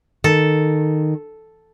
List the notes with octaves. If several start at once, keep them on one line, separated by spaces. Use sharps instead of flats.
D#3 A4